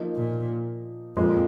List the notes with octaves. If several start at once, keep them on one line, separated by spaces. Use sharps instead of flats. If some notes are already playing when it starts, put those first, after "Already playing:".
Already playing: F3 A#3 D#4
A#2
F2 A#2 F3 G#3